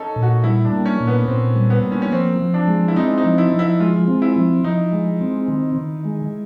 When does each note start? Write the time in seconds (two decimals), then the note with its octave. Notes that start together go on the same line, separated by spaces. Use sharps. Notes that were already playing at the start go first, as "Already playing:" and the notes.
Already playing: C#4 D#4 A4
0.16 A#2
0.23 F#4
0.44 G3 E4
0.65 D4
0.72 A#3
0.86 C#4
1.00 A#2
1.07 B3
1.27 A#2 C4
1.56 G3
1.70 B3
1.84 A#3
1.92 C#4
2.02 C#4
2.11 F3 C4
2.40 F3
2.54 D4
2.68 G#3
2.88 E4
2.96 C4 D#4
3.18 D#4
3.24 F3
3.38 E4
3.52 F3
3.59 E4
3.80 G#3 F4
4.08 C4
4.22 E4
4.36 F3
4.64 F3 D#4
4.92 G#3
5.21 C4
5.48 D#3
5.76 D#3
6.05 G#3